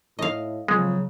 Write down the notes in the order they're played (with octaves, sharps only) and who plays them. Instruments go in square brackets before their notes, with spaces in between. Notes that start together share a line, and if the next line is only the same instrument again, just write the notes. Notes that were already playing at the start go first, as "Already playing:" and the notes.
[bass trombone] A2 [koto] D#5 F5
[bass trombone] F2 [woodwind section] C#3 F#3 [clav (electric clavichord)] G#3